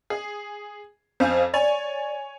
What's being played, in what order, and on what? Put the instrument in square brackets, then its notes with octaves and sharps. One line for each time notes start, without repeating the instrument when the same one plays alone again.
[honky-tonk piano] G#4
[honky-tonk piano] F2 F5 G#5 [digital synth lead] C5
[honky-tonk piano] C#5 G#5 [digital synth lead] D5